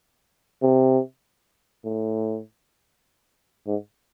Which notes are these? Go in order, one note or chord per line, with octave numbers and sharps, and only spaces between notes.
C3
A2
G#2